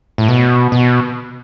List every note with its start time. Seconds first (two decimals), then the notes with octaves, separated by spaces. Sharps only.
0.18 A2
0.28 B2
0.72 B2